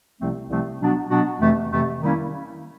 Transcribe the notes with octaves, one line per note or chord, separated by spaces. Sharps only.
C2 C3 F3 A3 C4
C2 C3 F3 A3 C4
B2 F#3 B3 D4 F#4
B2 F#3 B3 D4 F#4
F2 C3 E3 A3
F2 C3 E3 A3
D#3 G3 A#3 C#4 E4